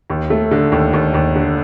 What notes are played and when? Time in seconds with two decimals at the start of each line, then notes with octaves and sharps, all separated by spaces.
0.10 D#2
0.30 A3
0.51 D3
0.72 D#2
0.93 D#2
1.14 D#2
1.36 D3